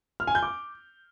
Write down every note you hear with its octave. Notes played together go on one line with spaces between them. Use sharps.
F6
G#5
G6
D6